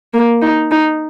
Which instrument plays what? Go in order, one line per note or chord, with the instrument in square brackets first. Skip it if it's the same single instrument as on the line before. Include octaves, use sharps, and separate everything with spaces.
[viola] A#3
D#4
D#4